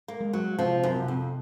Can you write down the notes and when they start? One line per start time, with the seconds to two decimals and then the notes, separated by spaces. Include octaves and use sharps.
0.08 A#3
0.20 G#3
0.33 F#3
0.59 C3 F3
0.83 F#2
0.96 C3
1.08 F2